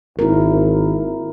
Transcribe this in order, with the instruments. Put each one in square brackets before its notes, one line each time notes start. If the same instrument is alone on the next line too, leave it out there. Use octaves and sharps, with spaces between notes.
[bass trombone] G#1 [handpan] E4 A#4